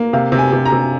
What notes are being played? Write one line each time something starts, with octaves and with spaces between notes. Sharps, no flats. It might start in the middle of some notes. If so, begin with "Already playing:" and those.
Already playing: A#3
C3 F5
C3
G#5
C3
A#5
C3